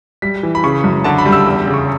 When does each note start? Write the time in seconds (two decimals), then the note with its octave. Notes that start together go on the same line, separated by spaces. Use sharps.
0.22 G3 B6
0.43 E3
0.55 B5
0.63 C#3 C#6
0.84 F#2
1.04 D3 A5
1.18 B5
1.25 G3
1.32 E6
1.46 E2
1.67 C#3
1.74 C#6